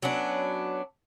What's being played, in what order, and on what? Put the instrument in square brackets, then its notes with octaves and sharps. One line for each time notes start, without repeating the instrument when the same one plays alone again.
[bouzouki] F#3 B3 C#4 D4